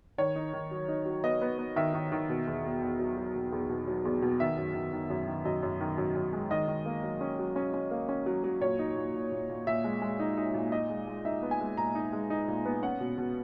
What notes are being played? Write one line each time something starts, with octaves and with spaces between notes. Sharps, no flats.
D#3 C#5
D#4
D#3
F#3
D#4
F#3
B3 D#5
B3
B3
D#3 E5
D#3
D#3
B2
E2
E2
E2
F#3
F#3
B2
E2
B2
F#3
E2
B2
D#3 E5
F#2
D#3
D#3
F#2
D#3
F#2 D#5
F#2
D#3
F#2
F#2
G#3
D#3 D#5
D#3
A#3
F#3
C#4
F#3
C#4
C#4
A#3
C#4
F#3
F#3
A#2 C#5
D#4
A#2
A#2
A#2
A#2
A#2 E5
G#3
G#3
D#4
D#4
A#2
D#4 D#5
G#3
G#3
D#4 E5
B3
G#5
G#3
A#2 A#5
D#4
G#3
D#4
A#2
B3
C#4 F#5
B2
B2